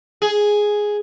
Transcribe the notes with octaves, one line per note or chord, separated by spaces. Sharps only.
G#4